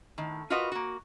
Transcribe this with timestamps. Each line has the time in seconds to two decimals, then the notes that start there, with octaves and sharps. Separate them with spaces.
0.18 A2 D#3
0.50 F4 F#4 A#4 B4 D#5 F#5
0.72 A#3 F#4